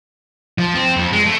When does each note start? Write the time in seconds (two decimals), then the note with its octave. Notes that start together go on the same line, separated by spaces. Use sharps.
0.58 F3
0.74 C4
0.97 F2
1.13 G#3
1.26 A3